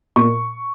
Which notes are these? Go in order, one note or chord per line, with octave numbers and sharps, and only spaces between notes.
A#2 C#6